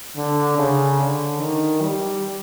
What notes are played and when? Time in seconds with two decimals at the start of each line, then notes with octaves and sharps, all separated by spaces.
0.17 D3
0.58 C#3
0.99 D3
1.41 D#3
1.82 G3